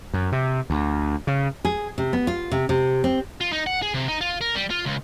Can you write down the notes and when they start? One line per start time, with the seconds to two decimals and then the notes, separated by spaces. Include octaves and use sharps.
0.14 F#2
0.32 C3
0.70 D2
1.27 C#3
1.65 G#4
1.98 C3
2.13 B3
2.27 F4
2.52 C3
2.69 C3
3.04 C4
3.41 F4
3.53 D#4
3.67 F#5
3.82 G#4
3.94 C3
4.08 D#4
4.21 F4
4.41 A#4
4.55 G3
4.71 F4
4.86 C#2